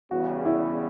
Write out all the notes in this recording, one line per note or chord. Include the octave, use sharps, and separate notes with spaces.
E2 C#3 G3 F#4
E4